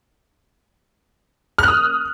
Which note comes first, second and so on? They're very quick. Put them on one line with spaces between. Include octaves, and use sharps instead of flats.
F6 F#6 D#6